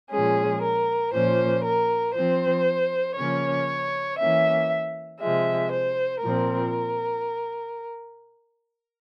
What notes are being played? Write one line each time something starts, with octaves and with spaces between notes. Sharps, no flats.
A#2 F3 G#3 C#4 G#4
A#4
A#2 F3 A#3 C#4 C5
A#4
F3 C4 C5
C#3 F3 A#3 C#4 C#5
E3 A#3 C#4 E5
C3 F3 G#3 E5
C5
A#2 F3 C4 A#4